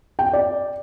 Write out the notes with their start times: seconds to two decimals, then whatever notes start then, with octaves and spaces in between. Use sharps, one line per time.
0.19 G5
0.33 D5